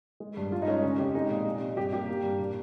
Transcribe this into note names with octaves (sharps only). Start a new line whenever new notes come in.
G#3
G2
G2 F4
D#4
G#3 C#4
C#3 C#4
F2 G4
G#3 D#4
A#2
C3
C3
G2 G4
A#3 G4
A#3
G2
A#2